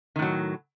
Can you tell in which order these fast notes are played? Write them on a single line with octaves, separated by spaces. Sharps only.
D#3 A2 F#3